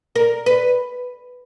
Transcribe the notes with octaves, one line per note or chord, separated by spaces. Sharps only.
A#4
B4